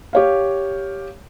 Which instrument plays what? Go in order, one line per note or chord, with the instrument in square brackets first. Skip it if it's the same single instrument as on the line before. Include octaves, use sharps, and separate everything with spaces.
[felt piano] G4 C#5 F5